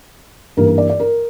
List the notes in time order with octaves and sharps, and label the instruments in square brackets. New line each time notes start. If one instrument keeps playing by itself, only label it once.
[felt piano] G2 E3 A#3 A#4
A#4
D5
D5
A#4